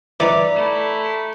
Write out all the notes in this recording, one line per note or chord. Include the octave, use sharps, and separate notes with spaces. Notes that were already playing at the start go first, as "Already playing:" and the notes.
E3 D#4 B4 D5 E5 A#5
A3 E4